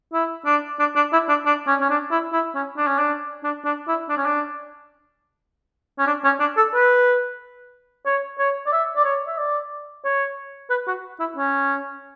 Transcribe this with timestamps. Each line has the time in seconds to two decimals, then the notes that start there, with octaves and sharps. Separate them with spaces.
0.13 E4
0.46 D4
0.80 D4
0.96 D4
1.13 E4
1.29 D4
1.46 D4
1.67 C#4
1.81 C#4
1.90 D4
2.11 E4
2.33 E4
2.55 C#4
2.77 D4
2.87 C#4
2.98 D4
3.44 D4
3.65 D4
3.88 E4
4.09 D4
4.17 C#4
4.25 D4
5.99 C#4
6.07 D4
6.24 C#4
6.40 D4
6.57 A4
6.74 B4
8.06 C#5
8.39 C#5
8.66 D5
8.72 E5
8.96 D5
9.05 C#5
9.27 E5
9.38 D5
10.04 C#5
10.70 B4
10.87 F#4
11.20 E4
11.37 C#4